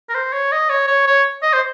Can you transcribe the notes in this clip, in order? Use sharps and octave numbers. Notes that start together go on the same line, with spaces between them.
A#4
C5
C#5
D#5
C#5
C#5
C#5
D#5
C5